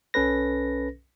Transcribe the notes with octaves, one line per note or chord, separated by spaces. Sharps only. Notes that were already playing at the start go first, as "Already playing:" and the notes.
B1 C#4 A4 B4 A#6